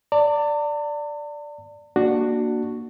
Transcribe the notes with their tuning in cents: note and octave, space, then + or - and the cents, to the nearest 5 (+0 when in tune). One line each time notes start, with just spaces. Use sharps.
D5 +0 A5 +45
A#3 +0 D4 +15 F#4 +0